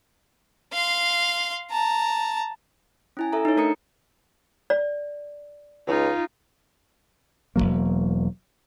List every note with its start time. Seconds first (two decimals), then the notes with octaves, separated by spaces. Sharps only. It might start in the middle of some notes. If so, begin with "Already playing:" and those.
0.73 F5 C6
1.71 A5 A#5
3.17 C#4 E4 G#5
3.32 A4 E5 A#5
3.45 D#4 C#5
3.57 A3 D4 A#4 A#5 D#6 C#7
4.70 D5
5.87 C#2 D#4 F4
7.56 E1 D#2 F#3 A#3